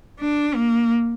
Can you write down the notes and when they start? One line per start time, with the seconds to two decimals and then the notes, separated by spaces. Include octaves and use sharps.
0.20 D4
0.55 A#3